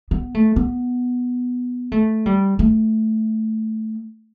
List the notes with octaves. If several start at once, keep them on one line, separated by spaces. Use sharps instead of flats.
B3
A3
B3
A3
G3
A3